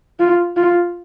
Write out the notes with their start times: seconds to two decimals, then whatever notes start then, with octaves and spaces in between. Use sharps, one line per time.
0.20 F4
0.56 F4